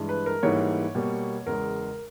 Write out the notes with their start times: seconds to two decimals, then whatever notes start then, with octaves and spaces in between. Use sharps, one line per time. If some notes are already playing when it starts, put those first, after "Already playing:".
Already playing: G2 E3 G#3
0.09 B4
0.26 A#4
0.43 G#2 E3 G3 A#3 C#5
0.95 B2 G3 A#3
1.46 E2 C#3 G#3 A#4